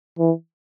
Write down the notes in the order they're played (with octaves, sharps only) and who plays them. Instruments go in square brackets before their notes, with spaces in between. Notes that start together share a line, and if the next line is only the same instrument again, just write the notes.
[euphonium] E3